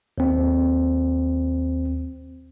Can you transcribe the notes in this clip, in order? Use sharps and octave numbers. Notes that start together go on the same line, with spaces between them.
D#2 C4